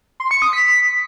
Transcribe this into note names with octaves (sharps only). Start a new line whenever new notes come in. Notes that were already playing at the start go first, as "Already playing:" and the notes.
C6
C#7
D#6
B6